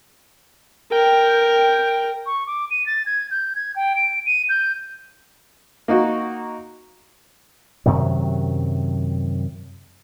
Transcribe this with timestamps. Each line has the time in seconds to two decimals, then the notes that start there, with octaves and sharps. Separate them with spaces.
0.92 A#4 G5
2.26 C#6
2.47 D6
2.71 D#7
2.86 A6
3.06 G#6
3.31 G6
3.56 G#6
3.76 G5
3.96 D7
4.26 D#7
4.49 G6
5.88 A#3 D#4 F#4
7.86 F#2 C3 D#3 F#3